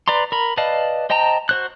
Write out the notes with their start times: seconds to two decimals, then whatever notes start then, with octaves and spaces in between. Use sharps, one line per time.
0.08 B4 D5 A#5 C6
0.32 A#4 B5
0.57 B4 D5 D#5 F5 A5
1.10 C5 D#5 G5 A5 A#5
1.49 F#4 C5 F#6